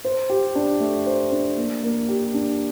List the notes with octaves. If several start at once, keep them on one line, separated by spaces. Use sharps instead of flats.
C5
G4
D4
A3
C5
D4
A#3
A#3
G4
D4